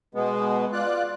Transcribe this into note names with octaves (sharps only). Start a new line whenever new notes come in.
B2 G#3 B3
F4 D5 F#6